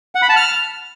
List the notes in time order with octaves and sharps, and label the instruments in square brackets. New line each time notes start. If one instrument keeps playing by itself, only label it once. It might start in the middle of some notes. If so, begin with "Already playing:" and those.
[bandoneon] F#5
B5
A5
F6